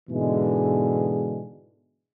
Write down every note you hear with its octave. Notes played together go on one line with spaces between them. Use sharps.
G#2 B2 D3 E3 G#3